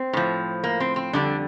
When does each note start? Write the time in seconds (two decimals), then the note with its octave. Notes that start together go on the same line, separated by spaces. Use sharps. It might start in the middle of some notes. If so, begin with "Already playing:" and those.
Already playing: C4
0.13 A2 F3
0.64 A#3
0.80 C4
0.96 C4
1.13 F2 D3 G3 D4